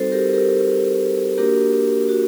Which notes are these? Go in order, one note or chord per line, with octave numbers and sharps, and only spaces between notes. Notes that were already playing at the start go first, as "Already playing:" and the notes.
Already playing: G3 C4 D#4 F#4 A4 C5
G4 A#4
G4 A#4
A#3 D4 F#4 G4 A#4
F#4